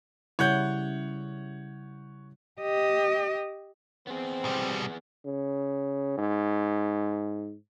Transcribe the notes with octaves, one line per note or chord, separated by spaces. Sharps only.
C#3 G3 E4 C#5 F#5 G6
G4 D#5
B3 C4 G#4
B2 G3
C#3
G#2